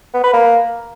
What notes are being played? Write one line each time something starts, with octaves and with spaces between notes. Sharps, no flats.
B3
B4
A#3